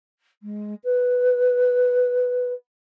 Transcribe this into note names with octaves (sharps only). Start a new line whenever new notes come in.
G#3
B4